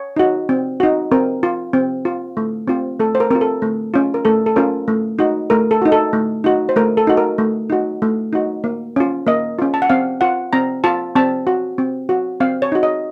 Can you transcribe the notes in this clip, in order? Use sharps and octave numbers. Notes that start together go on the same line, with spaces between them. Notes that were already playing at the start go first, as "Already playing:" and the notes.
Already playing: C#5
D#4 F#4
C4
D#4 F#4
C4 A#4
F4
C4
F4
A3
C4 F4
A3 A4
C5
A#4
C4 F4 A#4
A4
A3
C#4 F4
A#4
A3 A4
A4
C#4 F4 A#4
A3
D#4 F#4
A3 A#4
A4
D#4 F#4
A4
A3
D#4 F#4
C5
A3 A#4
A4
D#4 F#4
A#4
A3
D#4 F#4
A3
D#4 F#4
A#3
C#4 F4
A#3 D#5
C#4 F4
A5
F#5
C4 F5
F4 F#5
C4 A#5
F4 A5
C4 A5
F#4
C4
F#4
C4 F5
C#5
D#4 F#4
D#5